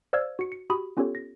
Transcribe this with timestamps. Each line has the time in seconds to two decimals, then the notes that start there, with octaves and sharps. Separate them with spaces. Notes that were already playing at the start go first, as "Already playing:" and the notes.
0.13 C5 D5 F5 E6 F6 G#6
0.39 F#4 C#7
0.52 C#7
0.70 F#4 G4 B5 D#6
0.97 B3 C#4 F4 G4 A4 C#5
1.15 A#6